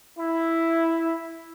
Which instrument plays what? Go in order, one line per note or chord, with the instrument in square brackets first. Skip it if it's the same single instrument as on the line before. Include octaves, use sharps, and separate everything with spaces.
[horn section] E4